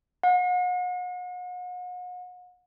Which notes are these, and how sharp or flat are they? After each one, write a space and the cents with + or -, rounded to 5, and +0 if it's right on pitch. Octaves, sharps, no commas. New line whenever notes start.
F#5 -40